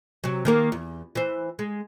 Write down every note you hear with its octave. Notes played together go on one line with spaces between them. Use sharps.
C3 F#3
D#3 A#3 A#4
E2
E3 C5
G#3